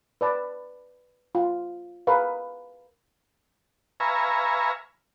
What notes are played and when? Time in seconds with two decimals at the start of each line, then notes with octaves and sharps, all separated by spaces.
0.21 B4 D5 A5
1.35 F4
2.07 G#4 A#4 B4 F5
4.00 B4 E5 F5 G#5 A#5 C#6